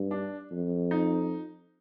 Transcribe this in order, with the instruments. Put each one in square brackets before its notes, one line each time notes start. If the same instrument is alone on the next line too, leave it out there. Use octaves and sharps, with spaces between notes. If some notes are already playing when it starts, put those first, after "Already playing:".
Already playing: [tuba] G2
[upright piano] D4
[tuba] F2
[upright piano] D#4